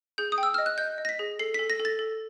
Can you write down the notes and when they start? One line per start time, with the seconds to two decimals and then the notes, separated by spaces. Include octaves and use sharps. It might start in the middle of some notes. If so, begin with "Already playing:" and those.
0.18 G#4 G6
0.32 D#6
0.38 G5
0.43 E6
0.54 D#5 F6
0.66 F#6
0.78 D#5 G6
0.98 D#5
1.05 A#6
1.09 B6
1.19 G#4
1.39 A4 C7
1.54 A4 B6
1.70 A#6
1.79 A4
1.85 A6
1.99 A4